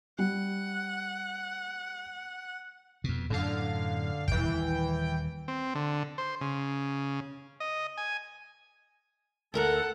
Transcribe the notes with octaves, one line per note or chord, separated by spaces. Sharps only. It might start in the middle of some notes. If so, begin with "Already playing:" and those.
G3 F#5
F2 B2
F#2 A2 D3 F5
D#1 G#1 E3 G5
C4
D3
C5
C#3
D#5
G#5
D2 A4 A#4 F#5 A#5